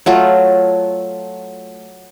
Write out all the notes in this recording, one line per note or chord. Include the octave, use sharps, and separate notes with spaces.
F#3 A3 F4